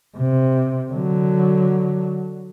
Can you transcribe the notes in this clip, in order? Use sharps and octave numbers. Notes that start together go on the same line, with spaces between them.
C3
D3 F#3